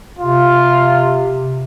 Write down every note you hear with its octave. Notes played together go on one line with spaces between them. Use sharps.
C3 F4